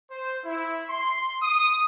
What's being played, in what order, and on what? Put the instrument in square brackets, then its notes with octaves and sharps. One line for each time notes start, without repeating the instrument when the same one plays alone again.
[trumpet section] C5
E4
C6
D#6